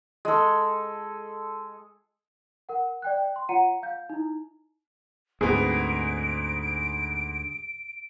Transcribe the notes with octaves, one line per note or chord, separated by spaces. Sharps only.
G#3 A4
A#4 F#5
D5 G5 F#6
C6
F4 C#5 F#5 A#5 C#7 D#7
F5 G6
D#4 E4
D2 G#2 B3 C4 G#4 D7